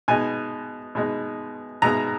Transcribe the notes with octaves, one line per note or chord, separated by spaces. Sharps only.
B2 G#3 D#4 G#5
B2 G#3 D#4
B2 G#3 D#4 A#5